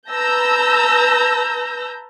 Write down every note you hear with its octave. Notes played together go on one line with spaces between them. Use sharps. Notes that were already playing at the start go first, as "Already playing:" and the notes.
B4 A5 A#5 E6 G6 A#6